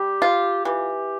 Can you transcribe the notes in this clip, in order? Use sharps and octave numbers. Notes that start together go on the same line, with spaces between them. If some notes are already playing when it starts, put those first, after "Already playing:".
Already playing: G3 G4
F4
E3 G4